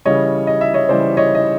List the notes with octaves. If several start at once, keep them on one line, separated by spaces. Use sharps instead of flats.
C#3 E3 G3 C#5 D#5
D#5
E5
C#5 D#5
C#3 E3 G3 C5 D5
C#5 D#5
D#5